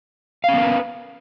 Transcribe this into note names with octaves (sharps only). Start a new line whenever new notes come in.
B3 C#4 A#4 B4 F5